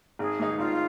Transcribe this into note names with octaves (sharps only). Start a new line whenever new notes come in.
G#1 G#4
G#2 D#3 G#3 D#4
G#1 F4